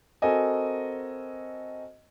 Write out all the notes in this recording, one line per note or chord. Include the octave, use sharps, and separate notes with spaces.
C4 F#4 A4 A#4 D#5 G#5